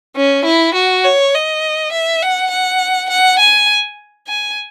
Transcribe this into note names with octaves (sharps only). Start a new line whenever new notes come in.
C#4
E4
F#4
C#5
D#5
E5
F#5
F#5
F#5
G#5
G#5